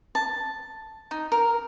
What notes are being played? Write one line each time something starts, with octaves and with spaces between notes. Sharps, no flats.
A5
D#4
A#4